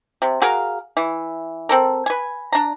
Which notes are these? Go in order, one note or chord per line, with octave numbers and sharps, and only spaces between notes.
C3
F#4 G#4 A#4 F5
E3
C4 A4 A#4
B4 G#5
D4 A#5